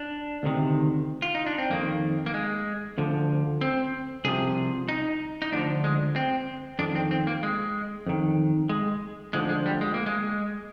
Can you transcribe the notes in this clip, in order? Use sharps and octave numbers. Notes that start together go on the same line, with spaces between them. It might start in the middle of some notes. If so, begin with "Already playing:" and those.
Already playing: D4
D2 C3 D#3
F4
D#4
D4
C4
F2 D#3 A#3
A#3
G#3
D2 D3 F3
C4
C2 C3 F3 G#4
D#4
D#4
D2 D3 F3 D4
G#3
C4
F2 D#3 D4
C4
C4
A#3
G#3
F2 D#3
G#3
D2 D3 F3 G#3
G#3
G3
G#3
A#3
G#3